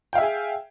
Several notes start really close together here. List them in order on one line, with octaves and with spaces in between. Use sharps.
G5 F5 E5 G#4 G#5